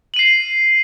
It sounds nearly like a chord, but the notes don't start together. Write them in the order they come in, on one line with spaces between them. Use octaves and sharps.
F#7 D#7 C7